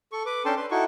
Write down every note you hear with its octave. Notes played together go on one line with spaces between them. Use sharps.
A4 C#6
B4 D6
C#4 D4 A4 G5 A5 C6
B4 C6
D#4 E4 F#4 A4 C#6